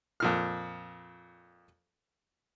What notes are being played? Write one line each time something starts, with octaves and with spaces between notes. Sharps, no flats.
F2 A#2 F6